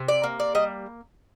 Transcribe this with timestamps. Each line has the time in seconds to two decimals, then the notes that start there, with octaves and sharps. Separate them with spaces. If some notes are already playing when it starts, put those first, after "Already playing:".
Already playing: C3
0.08 D5
0.24 A#3
0.40 D5
0.55 G3 D#5